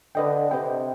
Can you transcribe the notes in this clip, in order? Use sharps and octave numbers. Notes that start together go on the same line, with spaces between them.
D3 B4 D#5 G5
C3 B4 D#5 G5